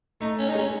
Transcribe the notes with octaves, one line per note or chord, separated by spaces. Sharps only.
A3 D#4
C#4
D#4
G#3 C#4